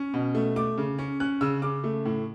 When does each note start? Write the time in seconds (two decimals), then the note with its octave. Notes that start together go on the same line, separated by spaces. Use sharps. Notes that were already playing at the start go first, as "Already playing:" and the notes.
Already playing: C#4
0.14 B2
0.35 A3
0.56 A3 D6
0.78 C#3
0.99 C#4
1.20 C#4 F#6
1.41 C#3 E6
1.62 C#3 D6
1.84 A3
2.05 A2